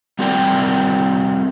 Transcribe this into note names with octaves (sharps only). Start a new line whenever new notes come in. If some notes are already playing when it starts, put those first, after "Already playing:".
G3 C4 F#4 A#4 D5 G5